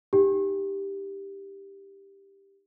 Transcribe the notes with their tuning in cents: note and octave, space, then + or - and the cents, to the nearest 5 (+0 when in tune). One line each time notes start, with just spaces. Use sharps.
D#4 +0 G4 +5